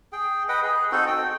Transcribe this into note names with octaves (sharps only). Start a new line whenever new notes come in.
G#4 G5
B4 D#5 F#5 G5
G#4
C4 D#4 F#4 A4
G5